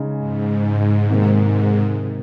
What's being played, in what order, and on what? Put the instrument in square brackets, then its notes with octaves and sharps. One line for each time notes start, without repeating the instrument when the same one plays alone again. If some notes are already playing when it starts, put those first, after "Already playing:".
Already playing: [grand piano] C#3 G#3 D#4
[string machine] G#2
[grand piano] C3 D#3 A#3